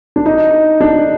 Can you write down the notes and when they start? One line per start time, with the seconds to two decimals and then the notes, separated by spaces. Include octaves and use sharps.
0.16 D4
0.26 D#4
0.81 D4